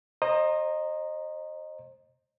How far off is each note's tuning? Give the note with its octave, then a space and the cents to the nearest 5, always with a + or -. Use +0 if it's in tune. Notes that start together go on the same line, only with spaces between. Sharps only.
C5 +30 D#5 -15 A#5 +0